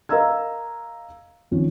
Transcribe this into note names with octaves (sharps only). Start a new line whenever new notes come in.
A#4 D#5 F5 A#5 E6 G#6
G#1 F2 C#4